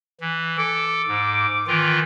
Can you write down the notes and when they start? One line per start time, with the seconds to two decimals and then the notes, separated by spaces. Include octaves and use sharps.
0.21 E3
0.58 A4 D6
1.07 G#2
1.67 D#3 E3 F4